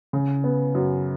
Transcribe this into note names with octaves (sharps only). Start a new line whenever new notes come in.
C#3
B3
F#2